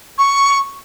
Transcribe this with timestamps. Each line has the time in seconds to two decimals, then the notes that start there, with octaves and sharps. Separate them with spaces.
0.18 C#6